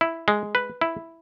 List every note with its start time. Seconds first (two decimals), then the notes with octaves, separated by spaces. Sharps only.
0.01 E4
0.28 G#3
0.55 B4
0.81 E4